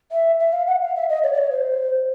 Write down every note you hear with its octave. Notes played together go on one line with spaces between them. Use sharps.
E5
E5
F5
F#5
F5
E5
D#5
C#5
D5
C#5
C5